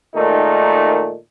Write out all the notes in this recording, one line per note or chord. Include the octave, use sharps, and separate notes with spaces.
A#2 D#3 G#3 A3 D#4